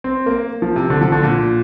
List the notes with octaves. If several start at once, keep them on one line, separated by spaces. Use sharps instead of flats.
C4
A#3
F3
C3
D3
F3
D3
A#2